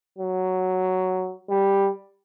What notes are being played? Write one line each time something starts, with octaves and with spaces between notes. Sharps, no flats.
F#3
G3